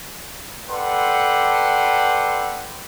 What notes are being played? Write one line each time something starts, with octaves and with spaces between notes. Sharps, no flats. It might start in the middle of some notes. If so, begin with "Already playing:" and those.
A4 B4 D5 F#5 G5 C6